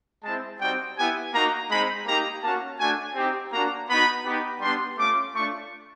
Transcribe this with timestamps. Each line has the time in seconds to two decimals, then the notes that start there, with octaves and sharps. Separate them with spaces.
0.24 G#3 C4 E4 A5
0.61 G3 C4 D#4 F#4 G5
0.97 B3 E4 G4 G#5
1.33 A#3 D#4 F#4 A#5
1.70 G#3 C4 D#4 B5
2.06 A#3 D#4 G4 A#5
2.42 A#3 C#4 F#4 A5
2.79 A3 D4 F#4 G#5
3.16 C4 D#4 G4
3.52 A#3 D4 F#4 A#5
3.89 B3 D#4 F#4 B5
4.25 B3 D#4 G4
4.61 G3 B3 D4 G4 C6
4.97 A3 C#4 F4 D6
5.34 A3 D4 F4 C#6